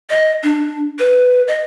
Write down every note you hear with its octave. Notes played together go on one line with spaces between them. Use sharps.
D#5
D4
B4
D#5